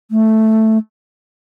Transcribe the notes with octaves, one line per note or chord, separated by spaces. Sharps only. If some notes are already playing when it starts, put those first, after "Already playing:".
A3